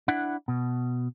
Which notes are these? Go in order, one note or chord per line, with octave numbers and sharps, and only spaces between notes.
D4 E4 F#5
B2